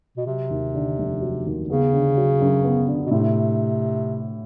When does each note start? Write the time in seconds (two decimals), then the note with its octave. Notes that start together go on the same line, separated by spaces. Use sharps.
0.17 B2
0.26 C3 F#3
0.50 D#2
0.75 D3
0.98 F1
1.21 F#3
1.46 D#2
1.69 C#3 B3
1.93 D3
2.17 F#3
2.41 F#2
2.64 B3
2.88 D3
3.06 B2
3.11 A2 C3